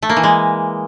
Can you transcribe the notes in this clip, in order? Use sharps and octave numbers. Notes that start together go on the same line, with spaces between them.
A3
A#3
E3
G#3